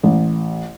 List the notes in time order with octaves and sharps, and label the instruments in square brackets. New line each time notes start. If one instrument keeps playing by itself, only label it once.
[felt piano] A1